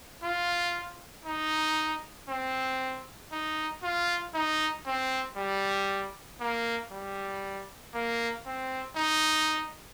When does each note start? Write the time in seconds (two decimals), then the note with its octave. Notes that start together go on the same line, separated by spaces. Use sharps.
0.24 F4
1.26 D#4
2.29 C4
3.32 D#4
3.83 F4
4.34 D#4
4.86 C4
5.37 G3
6.40 A#3
6.92 G3
7.94 A#3
8.46 C4
8.97 D#4